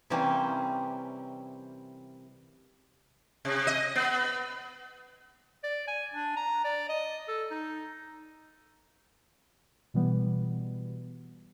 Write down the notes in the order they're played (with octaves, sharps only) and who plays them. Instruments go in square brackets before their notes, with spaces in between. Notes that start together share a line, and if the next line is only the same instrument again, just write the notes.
[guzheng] C3 E3 G3 A#3 C4 C#4
[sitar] C3
D#5
B3
[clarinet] D5
G#5
D4
A#5
D5
D#5
A4
D#4
[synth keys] B2 E3 G3 B3